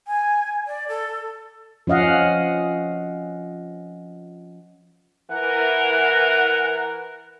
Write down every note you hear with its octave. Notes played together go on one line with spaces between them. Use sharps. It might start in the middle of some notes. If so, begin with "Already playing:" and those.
G#5
D5
A4
F3 C#4 D#5 F5 F#5
E3 A#4 F#5